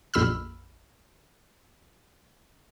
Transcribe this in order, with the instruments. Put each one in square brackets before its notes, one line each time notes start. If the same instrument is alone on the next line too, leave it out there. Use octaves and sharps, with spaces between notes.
[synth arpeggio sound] A#1 F2 B5 E6 F6